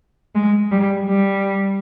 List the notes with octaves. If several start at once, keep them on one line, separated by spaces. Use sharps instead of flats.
G#3
G3
G3